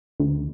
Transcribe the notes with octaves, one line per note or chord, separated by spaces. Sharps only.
D2